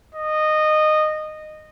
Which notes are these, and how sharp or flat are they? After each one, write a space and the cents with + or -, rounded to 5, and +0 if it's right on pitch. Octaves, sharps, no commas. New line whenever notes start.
D#5 -15